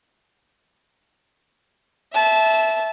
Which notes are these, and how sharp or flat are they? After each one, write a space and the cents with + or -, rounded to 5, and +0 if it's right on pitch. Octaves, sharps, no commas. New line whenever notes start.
E5 -5 A5 -20